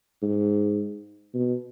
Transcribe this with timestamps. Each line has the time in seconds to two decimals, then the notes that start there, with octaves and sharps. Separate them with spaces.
0.22 G#2
1.34 B2